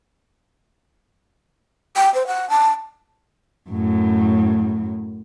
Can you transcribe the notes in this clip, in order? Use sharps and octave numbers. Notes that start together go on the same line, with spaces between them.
G5
C5
F#5
A5
F#2 A2